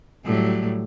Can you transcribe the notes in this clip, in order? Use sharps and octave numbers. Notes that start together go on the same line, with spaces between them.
A2 F#3 G3